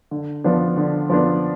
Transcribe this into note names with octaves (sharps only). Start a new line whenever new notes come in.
D3
F3 B3 D4
D3
F3 B3 D4